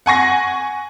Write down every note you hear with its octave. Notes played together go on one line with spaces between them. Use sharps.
F#5 G#5 C#6 A#6